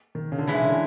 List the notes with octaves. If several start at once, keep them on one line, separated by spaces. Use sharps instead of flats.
D#3
C#3
D3
C#3 E3 G#3 C#4 E4
D3
C#3
D3